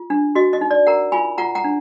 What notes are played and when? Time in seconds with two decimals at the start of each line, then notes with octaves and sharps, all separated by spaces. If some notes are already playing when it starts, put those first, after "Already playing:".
Already playing: F4
0.10 D4
0.35 F#4 D#5
0.53 D#5
0.61 D#4
0.71 D5
0.87 A#4 F#5 A#5
1.12 F4 G#5 B5
1.38 F4 F#5 A#5
1.55 F#5 A#5
1.64 D4